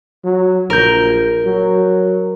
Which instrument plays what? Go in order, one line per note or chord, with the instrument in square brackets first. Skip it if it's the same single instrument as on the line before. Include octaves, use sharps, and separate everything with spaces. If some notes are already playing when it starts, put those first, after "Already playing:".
[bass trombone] F#3
[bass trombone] A#1 [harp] A#4 G6
[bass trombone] F#3